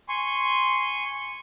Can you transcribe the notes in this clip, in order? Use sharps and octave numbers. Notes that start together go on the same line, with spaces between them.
G#5 C6 C#6